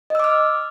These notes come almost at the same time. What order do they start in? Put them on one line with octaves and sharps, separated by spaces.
D#5 E6 D6 F6